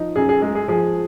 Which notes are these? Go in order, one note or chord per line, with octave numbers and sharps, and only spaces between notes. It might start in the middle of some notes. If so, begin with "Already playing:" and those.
Already playing: F3 D#4
F#2 G#4
G#4
G#3 G#4
G#4
F3 G#4